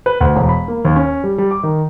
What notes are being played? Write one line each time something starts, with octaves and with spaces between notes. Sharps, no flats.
B4
D2
E1
B5
A#3
D#2
C#4
G3
G3
D6
D#3